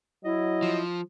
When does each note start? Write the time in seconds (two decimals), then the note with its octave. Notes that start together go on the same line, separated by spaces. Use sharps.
0.25 F#3 E4 D#5
0.62 F3